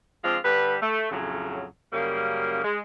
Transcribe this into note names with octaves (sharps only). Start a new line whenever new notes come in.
F3 G#3 C4 D4 F4
D3 G3 B4
A3
F2 A2 C#3 F#3
F#2 C#3 G3 A#3
G#3